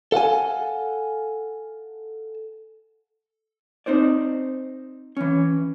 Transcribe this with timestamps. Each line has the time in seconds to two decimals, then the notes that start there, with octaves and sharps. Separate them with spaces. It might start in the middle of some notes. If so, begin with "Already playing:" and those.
0.12 A4 F5 F#5 G#5
3.86 C4 D#4 C5 D5
5.17 E3 C#4